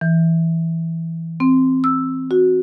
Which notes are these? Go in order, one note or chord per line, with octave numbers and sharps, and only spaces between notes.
E3
C4
E6
F#4